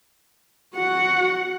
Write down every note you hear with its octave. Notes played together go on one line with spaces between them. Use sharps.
F#4 F#5